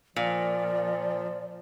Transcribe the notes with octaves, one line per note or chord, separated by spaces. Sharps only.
A#2 F3 D5